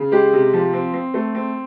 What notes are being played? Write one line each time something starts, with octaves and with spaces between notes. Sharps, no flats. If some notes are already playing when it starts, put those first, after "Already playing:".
Already playing: C#3
G#3 G4
C3
F3
C4
C4
A3
C4